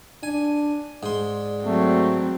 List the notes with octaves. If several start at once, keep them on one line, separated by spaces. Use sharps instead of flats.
D4 G#5
G#2 D5 C6
F#3 A3 C4